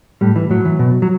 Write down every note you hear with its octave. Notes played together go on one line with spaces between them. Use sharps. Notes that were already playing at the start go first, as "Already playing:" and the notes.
A2 G3
E3
A2 F#3
E3
B2
F#3